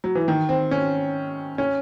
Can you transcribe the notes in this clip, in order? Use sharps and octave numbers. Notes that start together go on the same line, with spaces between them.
F#3
E3
D#3
C4
C#4
C#4